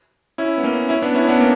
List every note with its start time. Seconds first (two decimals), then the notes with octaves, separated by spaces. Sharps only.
0.38 C#4 E4
0.58 B3
0.63 A#3 C#4
0.89 C#4 E4
1.02 B3 D4
1.15 C#4 E4
1.28 B3 D4
1.40 A#3